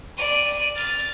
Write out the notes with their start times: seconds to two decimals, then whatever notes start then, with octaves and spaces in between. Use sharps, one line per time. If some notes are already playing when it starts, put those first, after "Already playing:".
0.17 D5 D#7
0.76 F6 A6